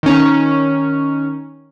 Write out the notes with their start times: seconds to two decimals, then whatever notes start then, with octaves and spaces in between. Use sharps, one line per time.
0.03 D#3 C#4